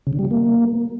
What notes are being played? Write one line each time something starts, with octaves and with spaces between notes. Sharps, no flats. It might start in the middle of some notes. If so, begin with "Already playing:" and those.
C#3
D3
G3
F#3
A#3